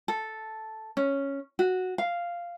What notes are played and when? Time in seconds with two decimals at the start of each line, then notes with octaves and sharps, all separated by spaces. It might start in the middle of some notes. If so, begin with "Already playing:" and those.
0.08 A4
0.97 C#4
1.59 F#4
1.98 F5